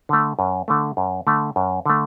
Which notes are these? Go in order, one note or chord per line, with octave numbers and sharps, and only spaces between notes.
D3 A3
F#2
D3 A3
F#2
D3 A3
F#2
D3 A3